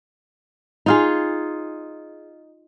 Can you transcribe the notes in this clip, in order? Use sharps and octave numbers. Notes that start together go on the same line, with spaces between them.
D#4 F4 G#4